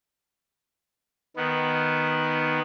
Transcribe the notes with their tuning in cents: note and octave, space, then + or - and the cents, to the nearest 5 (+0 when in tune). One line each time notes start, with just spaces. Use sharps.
D#3 +0 B3 +0